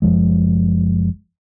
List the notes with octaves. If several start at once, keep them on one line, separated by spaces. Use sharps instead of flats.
F#1 E2 F3 G#3